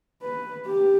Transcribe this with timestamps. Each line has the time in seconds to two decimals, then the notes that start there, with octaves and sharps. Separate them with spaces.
0.22 B4
0.66 G4